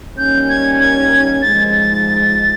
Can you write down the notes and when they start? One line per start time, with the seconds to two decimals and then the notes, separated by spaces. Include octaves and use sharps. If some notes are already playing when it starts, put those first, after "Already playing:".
0.17 D#3 G3 A#3 C#4 G6
0.49 G#6
0.80 G#6
1.42 G#2 F3 G#3 A6
1.72 A6